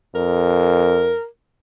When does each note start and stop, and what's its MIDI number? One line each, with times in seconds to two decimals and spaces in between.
0.15 1.16 41
0.15 1.26 70